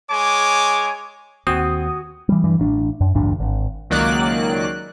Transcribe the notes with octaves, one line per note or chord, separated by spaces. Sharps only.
G#3 C#5 G#5 D6
D#2 C4 F#4 G#5 D#6
E3 G3
G2 E3
A1 D4
F#2
A1 D2 G2 D4
G#1
C#2 D#3 F#3 A#3 D5 F#6